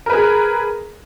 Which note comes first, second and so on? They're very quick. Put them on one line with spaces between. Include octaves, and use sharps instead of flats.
A#4 B4 G#4